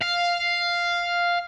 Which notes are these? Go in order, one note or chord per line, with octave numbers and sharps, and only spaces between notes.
F5